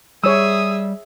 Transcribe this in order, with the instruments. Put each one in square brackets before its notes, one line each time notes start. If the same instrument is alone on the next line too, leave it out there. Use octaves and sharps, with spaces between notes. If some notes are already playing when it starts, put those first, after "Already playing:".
[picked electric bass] G3 [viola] G#4 E5 [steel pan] C#5 E6 [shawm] D#6